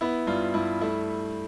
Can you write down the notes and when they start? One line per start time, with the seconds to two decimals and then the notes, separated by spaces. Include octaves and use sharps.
0.01 B3 E4
0.27 G2 F4
0.54 G2 E4
0.81 A3 E4